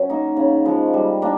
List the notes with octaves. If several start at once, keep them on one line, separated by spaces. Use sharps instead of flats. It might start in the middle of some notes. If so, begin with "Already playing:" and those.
Already playing: F#3 C#4
A#3 D#4
C#3
F3 G#3
G3
A#3 D4